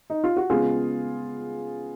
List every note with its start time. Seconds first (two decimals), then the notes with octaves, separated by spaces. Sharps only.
0.10 D#4
0.24 F4
0.37 F#4
0.50 C#3 G#3 B3 F4 G#4